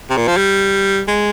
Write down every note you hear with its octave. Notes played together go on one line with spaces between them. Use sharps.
C3
A#2
F3
G3
G#3